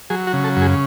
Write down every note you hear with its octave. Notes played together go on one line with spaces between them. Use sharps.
F#3 G#4
F#4
C#3
A4
F#2
G#4